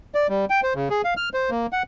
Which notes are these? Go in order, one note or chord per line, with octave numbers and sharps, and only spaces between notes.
D5
G3
G5
C5
C#3
G#4
F5
F6
C5
A#3
F#5